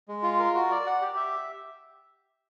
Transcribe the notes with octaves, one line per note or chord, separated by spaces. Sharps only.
G#3
F4
A#4
F#4
D5
F#5
G4
E5